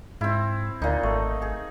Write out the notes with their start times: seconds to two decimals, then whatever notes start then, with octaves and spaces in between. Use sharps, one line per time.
0.21 G#2 C4 E4
0.82 D2 A#2 D#4
1.03 G#1 A3
1.42 G#4